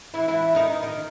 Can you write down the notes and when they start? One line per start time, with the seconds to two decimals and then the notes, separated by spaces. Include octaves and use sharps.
0.14 E3 E4
0.28 E3 E4
0.55 D#3 D#4
0.83 D#3 D#4